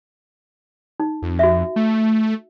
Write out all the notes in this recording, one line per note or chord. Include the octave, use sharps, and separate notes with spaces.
D#4
F2
F#4 E5
A3